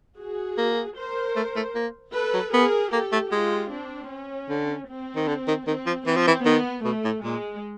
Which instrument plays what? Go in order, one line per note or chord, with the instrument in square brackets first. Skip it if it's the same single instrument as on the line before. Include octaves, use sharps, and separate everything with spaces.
[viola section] F#4 G#4
[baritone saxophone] A#3
[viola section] A#4 C5
[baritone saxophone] A3
A3
A#3
[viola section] A4 B4
[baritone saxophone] F#3
[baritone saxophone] B3 [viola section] G#4 A#4
[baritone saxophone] A#3 [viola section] G4 A4
[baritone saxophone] A3
[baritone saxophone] G#3 [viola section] F4 G4
[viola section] C4 D4
C#4
[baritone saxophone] D3
[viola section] C4
[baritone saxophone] D#3
D3
D#3
[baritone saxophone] D#3 [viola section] C4
[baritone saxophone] F3
[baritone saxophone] E3 [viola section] C4
[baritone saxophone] F3
E3
[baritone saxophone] D#3 [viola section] B3
[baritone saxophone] B2 [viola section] A3
[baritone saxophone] A2
[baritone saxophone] A#2 [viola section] G#3